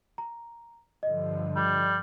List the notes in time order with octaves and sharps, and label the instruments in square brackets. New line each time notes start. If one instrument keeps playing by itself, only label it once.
[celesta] A#5
[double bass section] G2 D3 F3 [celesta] D#5
[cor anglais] G3